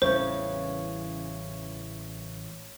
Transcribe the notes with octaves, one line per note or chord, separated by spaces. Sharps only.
A1 C#3 E3 G3 C5 C#5